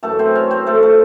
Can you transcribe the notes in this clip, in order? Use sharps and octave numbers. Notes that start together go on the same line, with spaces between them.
F#2 E3 A3 A4
C4 C5
C#4 C#5
C4 C5
A3 A4
A3 A4